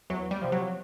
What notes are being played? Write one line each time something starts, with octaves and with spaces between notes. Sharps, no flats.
E2 F#3
G3
C3 F3
F#3